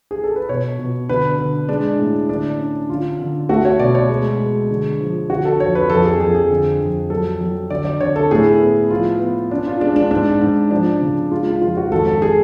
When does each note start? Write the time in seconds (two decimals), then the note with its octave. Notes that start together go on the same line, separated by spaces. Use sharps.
0.11 G#4
0.24 A4
0.36 B4
0.49 B2 C#5
0.79 B2
1.09 D3 B4
1.39 D3
1.69 G#3 D4
1.99 A2
2.29 D3 D4
2.59 C#4
2.89 D3 F4
3.20 D3
3.49 A3 F#4
3.65 C#5
3.79 B2 D5
3.95 C#5
4.09 G#3
4.40 G#3
4.70 D3
5.00 F3
5.30 D3 F#4
5.45 A4
5.60 F2 C#5
5.75 B4
5.90 F2 A4
6.05 G#4
6.20 F2 G#4
6.35 G#4
6.50 D3
6.80 F2
7.10 F#3 A4
7.41 F#3
7.70 D3 D5
7.85 D5
8.01 D3 C#5
8.16 A4
8.31 A2 G#4
8.61 B3
8.91 F3 F4
9.20 B3
9.51 C#4 D4
9.66 F4
9.81 G#3 D4
9.96 D4
10.11 G#2 D4
10.41 G#2
10.71 F3 D4
11.02 C#3
11.31 G#3 F4
11.47 F4
11.61 F2 F4
11.77 F#4
11.91 G#1 A4
12.07 A4
12.22 G#4